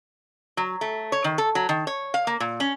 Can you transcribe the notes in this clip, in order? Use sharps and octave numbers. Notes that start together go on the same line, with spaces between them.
F#3
A3
C#5
D#3
A4
F#3
D#3
C#5
F5
A#3
A#2
C#4